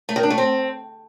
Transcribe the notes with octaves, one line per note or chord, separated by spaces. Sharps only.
A3
D#3
D4
A3
C4